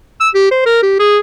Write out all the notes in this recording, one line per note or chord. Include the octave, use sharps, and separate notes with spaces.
E6
G4
C5
A#4
G4
G#4